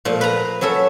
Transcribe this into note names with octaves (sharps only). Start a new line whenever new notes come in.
A#2 F3 A3
B4 A#5
F#3 C#4 A4 E5